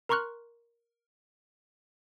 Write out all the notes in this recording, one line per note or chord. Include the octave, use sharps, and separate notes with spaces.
A#4 A#5 C6 C#6 F6 F#6